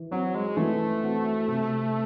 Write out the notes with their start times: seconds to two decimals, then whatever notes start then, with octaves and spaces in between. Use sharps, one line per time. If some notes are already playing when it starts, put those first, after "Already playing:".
Already playing: E3
0.11 F#3 C4 F#4
0.35 G#3
0.57 E3 A3
1.03 C4 F#4
1.48 C3